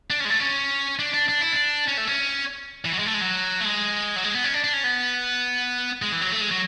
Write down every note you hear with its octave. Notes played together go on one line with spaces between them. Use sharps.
D4
C#4
G#3
A3
C#4
D4
D4
D4
E4
D4
C#4
A3
C#4
E3
F#3
G#3
A3
G#3
F#3
A3
G#3
F#3
G#3
B3
C#4
D4
D4
C#4
B3
G#3
E3
F#3
A3
G#3
F#3